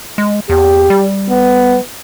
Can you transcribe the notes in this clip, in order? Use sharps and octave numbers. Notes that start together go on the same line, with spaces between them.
G#3
E2 G4
G3
B3